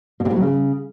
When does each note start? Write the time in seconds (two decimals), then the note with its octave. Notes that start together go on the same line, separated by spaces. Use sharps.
0.20 B2
0.25 C3
0.31 A2
0.36 F#3
0.41 C#3